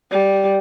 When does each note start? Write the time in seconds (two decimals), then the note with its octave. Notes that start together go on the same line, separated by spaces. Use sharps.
0.11 G3